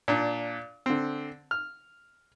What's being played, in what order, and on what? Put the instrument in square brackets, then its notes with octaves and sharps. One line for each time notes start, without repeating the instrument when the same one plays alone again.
[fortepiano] A#2 D4
D3 C4
F6